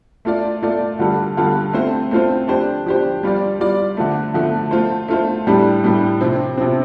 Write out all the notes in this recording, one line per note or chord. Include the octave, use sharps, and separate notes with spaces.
A3 F4 D5
A3 F4 D5
D3 G3 F4 A4
D3 G3 F4 A4
A3 C4 F4 C5
A3 C4 F4 C5
F3 D4 G4 C5
F3 D4 G4 C5
G3 F4 D5
G3 F4 D5
D3 F3 A3
D3 F3 A3
A3 F4 C5
A3 F4 C5
A2 G3 D4 G4
A2 G3 D4 G4
C3 F3 C4
C3 F3 C4